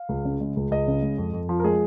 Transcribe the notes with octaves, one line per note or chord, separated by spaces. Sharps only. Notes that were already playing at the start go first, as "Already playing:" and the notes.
Already playing: F5
C#2
C#3
G#3
C#2
C#2 D#5
C#3
G#3
F2
F2
F3
A#4
G#3 G#4